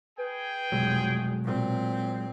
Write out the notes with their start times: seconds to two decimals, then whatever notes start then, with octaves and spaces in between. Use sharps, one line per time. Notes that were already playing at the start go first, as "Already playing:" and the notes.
0.18 G#4 B4 G5
0.72 F1 B2 F#3 G#3
1.44 A#2 C4